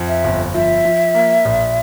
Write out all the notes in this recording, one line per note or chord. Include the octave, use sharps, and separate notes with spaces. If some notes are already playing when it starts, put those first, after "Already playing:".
Already playing: F2
E5
G1
F3 E5
F3
A#3
A#1